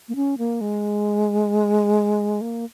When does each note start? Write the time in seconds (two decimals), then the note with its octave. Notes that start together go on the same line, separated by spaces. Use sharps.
0.09 A#3
0.16 C#4
0.38 A#3
0.61 G#3
2.41 A#3